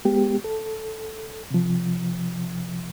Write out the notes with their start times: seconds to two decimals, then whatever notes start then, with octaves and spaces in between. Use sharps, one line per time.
0.05 G#3 B3 G4
0.44 A4
1.50 C3 F3